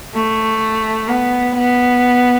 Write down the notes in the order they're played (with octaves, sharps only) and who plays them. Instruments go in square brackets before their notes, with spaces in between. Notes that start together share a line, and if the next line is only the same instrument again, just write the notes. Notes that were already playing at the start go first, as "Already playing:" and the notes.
[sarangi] A3
B3
B3